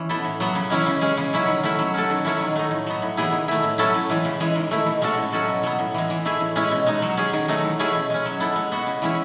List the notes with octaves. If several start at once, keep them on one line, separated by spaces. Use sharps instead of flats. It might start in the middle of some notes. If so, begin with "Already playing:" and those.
Already playing: E3 C#4
B3 E4 A4
A2
F#3 B3
C#3
E3 G#3 C#4 E4
C#3
G#3 C#4 G#4
C#3
F#3 C#4 E4
D#3
A3 C#4 E4
F#3
C#4 F#4 A4
D#3
F#3 A3 C#4 E4
D#3
A3 D#4
A2
F#3 B3
A2
E3 B3 E4 G#4
D#3
A3 E4
A2
F#3 C#4 E4 A4
A2
E3 G#3
C#3
E3 G#3
D#3
A3 E4
B2
G#3 C#4 F#4 A4
A2
F#3 C#4 F#4 A4
B2
F#3 B3
A2
E3 G#3
E3
A3 E4 G#4
A2
G#3 C#4 E4
B2
G#3 D#4
F#3
C#4 G#4
D#3
F#3 A3 D#4
E3
A3 C#4 E4 G#4
B2
G#3 C#4
F#3
B3 E4 A4
G#3
B3 F#4
C#3
E3 G#3 C#4 E4